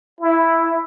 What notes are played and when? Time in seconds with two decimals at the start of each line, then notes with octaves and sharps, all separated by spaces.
0.21 E4